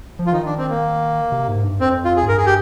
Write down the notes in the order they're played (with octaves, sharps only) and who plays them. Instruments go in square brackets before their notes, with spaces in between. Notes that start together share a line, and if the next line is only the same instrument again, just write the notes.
[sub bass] F3
[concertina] F4
[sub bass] D#3 [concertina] D#4
[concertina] D4
C4
A#3
[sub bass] C3
G#2
G2
[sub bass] F2 [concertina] C4
[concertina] F4
G#4
[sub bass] G#2
[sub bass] G2 [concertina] A#4
[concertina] G#4
G4